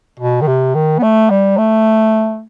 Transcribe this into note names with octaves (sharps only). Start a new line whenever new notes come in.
B2
D#3
C3
D#3
B3
A3
G3
A3